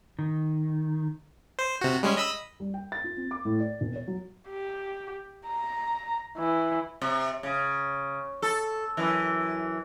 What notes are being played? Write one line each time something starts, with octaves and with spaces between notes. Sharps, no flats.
D#3
C5
C3 F#4
G3 G#3 C#4
D#5 B5 E6
G3
G5
A6
F4
C4
D6
A2
D5
E1
C#5
F#3
G4
A#5
E3
C3
C#3
A4
F#2 E3